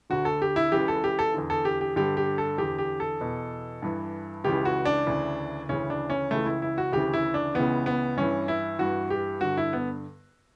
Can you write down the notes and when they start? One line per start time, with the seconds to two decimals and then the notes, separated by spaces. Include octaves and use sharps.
0.10 D2 D3 F#4
0.25 A4
0.42 G4
0.56 E4
0.72 C#2 C#3 E3 G4
0.88 A4
1.04 G4
1.19 A4
1.34 E2 D3
1.50 A4
1.65 G4
1.81 G4
1.96 G2 D3 G4
2.17 G4
2.38 A4
2.58 E2 D3 G4
2.78 G4
3.00 A4
3.21 E2 B2
3.82 G2 E3
4.44 C#2 C#3 E3 G4
4.65 F#4
4.85 D4
5.06 D2 C#3 E3
5.69 D2 C#3 E3 C#4
5.90 D4
6.10 C#4
6.31 C#2 C#3 E3 A3
6.46 E4
6.62 E4
6.78 F#4
6.92 D2 C#3 E3 G4
7.13 E4
7.34 D4
7.54 C#2 C#3 E3 B3
7.86 B3
8.17 G2 E3 C#4
8.48 E4
8.79 G2 E3 F#4
9.10 G4
9.41 G2 D3 F#4
9.57 E4
9.73 B3